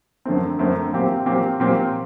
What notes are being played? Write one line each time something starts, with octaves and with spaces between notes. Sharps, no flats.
F#2 D3 A3 C4
F#2 D3 A3 C4
A#2 F#3 C4 G4
A#2 F#3 C4 G4
A#2 F#3 C4 G4